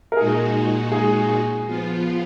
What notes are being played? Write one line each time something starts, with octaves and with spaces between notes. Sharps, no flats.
A#4
A#2 G#3 D#4 F#4 G#4
G#4
F3 B3 F4